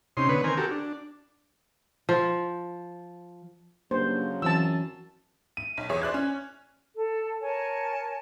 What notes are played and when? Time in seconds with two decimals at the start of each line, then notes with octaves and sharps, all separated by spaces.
0.17 C3 C#4 D#4 C6
0.29 D3 B3 B4 C#5
0.44 D#3 C4 A#4 G#5
0.57 F#4 G4 A4 A#4
0.71 D4
2.09 F3
3.91 G2 C#3 F3 F#3 A#3 C5
4.42 F#2 E3 C4 A5 E6
5.57 D#7
5.77 B1
5.89 E2 G#4 C#5
6.02 C5 D5 F#6 G#6
6.14 C#4
6.96 A4
7.41 A#4 C#5 G#5 A5